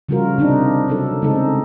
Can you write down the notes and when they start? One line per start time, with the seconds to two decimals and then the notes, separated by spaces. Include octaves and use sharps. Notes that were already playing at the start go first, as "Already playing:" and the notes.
0.09 C#3 F3 G3 F4 F#4 A#4
0.38 C3 D4 D#4
0.88 F#3 D#4 A4
1.22 C#3 G#3 C4 D#4 A4